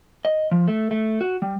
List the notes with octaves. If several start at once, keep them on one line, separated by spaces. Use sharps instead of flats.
D#5
F3
A3
A3
F#4
G3